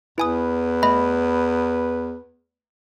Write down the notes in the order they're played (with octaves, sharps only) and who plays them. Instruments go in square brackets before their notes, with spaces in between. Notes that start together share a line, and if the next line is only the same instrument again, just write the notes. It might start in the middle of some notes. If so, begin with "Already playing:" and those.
[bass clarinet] E2 [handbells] E4 G#5 D#6 [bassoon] B4
[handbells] A3 D#5 B5